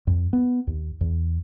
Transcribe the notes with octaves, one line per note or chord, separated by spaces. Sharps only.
F2
B3
D#2
E2